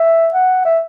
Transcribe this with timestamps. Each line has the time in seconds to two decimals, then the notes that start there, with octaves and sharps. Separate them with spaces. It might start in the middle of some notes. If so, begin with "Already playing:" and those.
Already playing: E5
0.34 F#5
0.65 E5